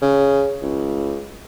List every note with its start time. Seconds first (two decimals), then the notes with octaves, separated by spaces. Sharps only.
0.02 C#3
0.62 C#2